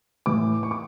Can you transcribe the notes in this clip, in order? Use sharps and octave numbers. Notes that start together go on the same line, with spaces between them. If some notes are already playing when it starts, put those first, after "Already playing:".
A2 E3 D6
C#6
D6